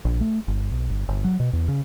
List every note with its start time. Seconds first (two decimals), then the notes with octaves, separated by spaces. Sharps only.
0.05 A#1
0.21 A3
0.48 G1
0.71 B1
0.90 G1
1.08 G1
1.24 F#3
1.40 B2
1.53 E2
1.68 C#3